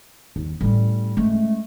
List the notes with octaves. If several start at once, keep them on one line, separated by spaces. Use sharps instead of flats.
D#2
A2 G3 C#4
G#3 A3 C#4